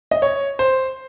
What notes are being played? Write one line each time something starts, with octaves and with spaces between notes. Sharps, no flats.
D#5
C#5
C5